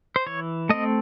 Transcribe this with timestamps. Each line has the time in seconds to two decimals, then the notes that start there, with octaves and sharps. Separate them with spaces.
0.16 C5
0.27 E3 C#5
0.69 A3 C4 D#5